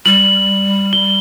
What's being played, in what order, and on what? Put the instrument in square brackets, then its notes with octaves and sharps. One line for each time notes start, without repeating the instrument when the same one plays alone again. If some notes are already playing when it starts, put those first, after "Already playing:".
[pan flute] G3 [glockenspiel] F#7
[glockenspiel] G7